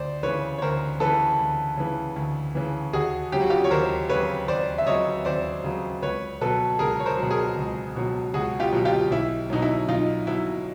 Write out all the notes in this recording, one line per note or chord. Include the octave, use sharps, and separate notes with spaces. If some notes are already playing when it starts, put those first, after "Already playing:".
Already playing: D2 C5 D5
C#3 E3 B4 C#5
C#5
D2 A#4 C5
C#3 E3 A4 B4
D2
C#3 E3
D2
C#3 E3
D#2 F#4 G#4
C#3 F#3 G4
F#4
F4 G4
C#5
D#2 A#4 C5
C#3 F#3 B4 C#5
D#2 C5 D5
E5
C#3 F#3 C#5 D#5
D#2 C5 D5
C#3 F#3
C#2 B4 C#5
B2 F#3 A4 B4
C#2 G#4 A#4
C#5
A#4 C5
B2 F#3
G#4 A#4
C#2
B2 F#3
C#2 F#4 G#4
F4 G4
B2 F#3
F4 G4
B1 E4
B2 F#3 D#4
E4
B1 D#4 F4
B2 F#3 E4